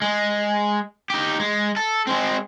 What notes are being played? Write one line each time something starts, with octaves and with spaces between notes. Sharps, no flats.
G#3
D#4 G4
G#3
A4
G#3 C4